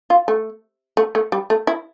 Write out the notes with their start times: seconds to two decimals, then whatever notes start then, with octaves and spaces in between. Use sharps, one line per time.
0.10 F4
0.28 A3
0.97 A3
1.15 A3
1.32 G3
1.50 A3
1.67 E4